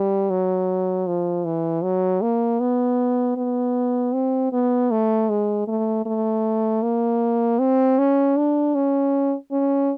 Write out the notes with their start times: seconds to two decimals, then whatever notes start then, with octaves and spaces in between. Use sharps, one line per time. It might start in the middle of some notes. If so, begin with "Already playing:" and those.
Already playing: G3
0.30 F#3
1.07 F3
1.45 E3
1.83 F#3
2.22 A#3
2.60 B3
3.37 B3
4.14 C4
4.53 B3
4.91 A3
5.30 G#3
5.68 A3
6.06 A3
6.83 A#3
7.59 C4
7.99 C#4
8.37 D4
8.75 C#4
9.52 C#4